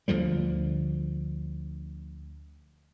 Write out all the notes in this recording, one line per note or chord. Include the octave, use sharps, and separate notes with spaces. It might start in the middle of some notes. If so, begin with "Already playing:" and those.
D2 D3 F3 G3